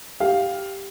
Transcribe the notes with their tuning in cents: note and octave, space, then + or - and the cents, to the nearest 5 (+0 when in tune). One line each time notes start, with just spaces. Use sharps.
G4 +0 F5 +5